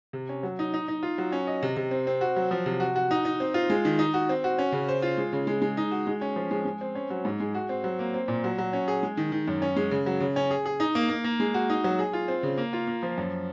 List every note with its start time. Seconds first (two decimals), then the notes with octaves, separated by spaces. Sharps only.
0.13 C3
0.29 C#4
0.43 F#3
0.59 D#4
0.74 D#4
0.88 D#4
1.03 F4
1.18 F#3
1.32 C#4
1.47 D#5
1.63 C3
1.77 C3
1.91 C4
2.07 C4
2.21 F#4
2.36 F#3
2.51 F3
2.66 C3
2.80 F#4
2.96 F#4
3.11 D#4
3.25 D#4
3.40 C4
3.54 F4
3.70 G#3
3.85 D#3
3.99 D#4
4.14 F#4
4.29 C4
4.44 F#4
4.58 C#4
4.72 C#3
4.88 C5
5.02 F4
5.18 G#3
5.33 C#3
5.47 G#3
5.62 G#3
5.77 D#4
5.91 F#4
6.07 G#3
6.21 C#4
6.36 F3
6.51 G#3
6.65 G#3
6.81 C4
6.95 C#4
7.10 F#3
7.25 G#2
7.40 G#3
7.54 F#4
7.69 C4
7.84 F#3
7.99 A#3
8.14 C4
8.28 A#2
8.44 F#3
8.58 F#3
8.73 C#4
8.88 G#4
9.03 G#3
9.17 D#3
9.32 D#3
9.48 F#2
9.62 C#4
9.76 G#3
9.91 C#3
10.06 F#3
10.21 C#3
10.36 C#4
10.51 G#4
10.66 G#4
10.80 D#4
10.95 A#3
11.09 A#3
11.24 A#3
11.40 G#3
11.54 F#4
11.70 D#4
11.84 F#3
11.99 G#4
12.13 F4
12.28 C4
12.43 C#3
12.57 A#3
12.73 F4
12.87 A#3
13.03 F3
13.18 F#2